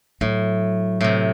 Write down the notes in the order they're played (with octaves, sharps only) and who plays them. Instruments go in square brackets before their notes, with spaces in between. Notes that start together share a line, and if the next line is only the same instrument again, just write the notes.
[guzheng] A2 [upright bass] F#3
[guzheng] A2 C3